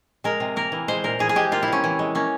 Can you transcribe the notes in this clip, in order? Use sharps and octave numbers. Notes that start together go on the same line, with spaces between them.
G#3 A#4
C3
A#3 A#4
E3
G#3 C5
A#2 A#4
E3 G#4
G#4
G#3 G4
A#3 F4
E4
C3 C#4
E3
G#3
A#3 C#4